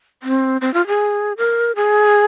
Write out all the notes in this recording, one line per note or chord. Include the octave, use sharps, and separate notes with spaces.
C4
C4
F4
G#4
A#4
G#4